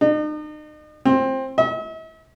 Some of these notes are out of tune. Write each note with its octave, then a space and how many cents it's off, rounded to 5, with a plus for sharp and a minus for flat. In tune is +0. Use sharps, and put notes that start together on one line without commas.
D#4 -40
C4 +20
E5 -45